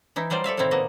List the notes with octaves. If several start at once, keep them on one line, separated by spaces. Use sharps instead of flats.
E3 D#4 E4
F#3 G3 F4 C5 D5
A4 D5 E5 F5
A2 C3 D#3 C4 E4 F5
A#2 A#3 B3 D#5